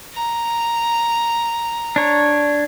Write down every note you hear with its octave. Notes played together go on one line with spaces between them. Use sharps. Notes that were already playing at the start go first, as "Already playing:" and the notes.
A#5
D4 C#5